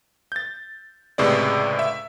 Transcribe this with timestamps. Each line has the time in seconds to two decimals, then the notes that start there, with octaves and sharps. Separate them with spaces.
0.32 G6 A6
1.18 C#2 A2 C3 G#3 B4 D5
1.79 E5